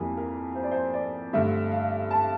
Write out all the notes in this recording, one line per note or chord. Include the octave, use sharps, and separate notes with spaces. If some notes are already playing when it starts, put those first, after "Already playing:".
Already playing: F2 E3 G3 A#3
A#4
C5
D5
C5
D5
G2 D3 A3 E5
F5
A5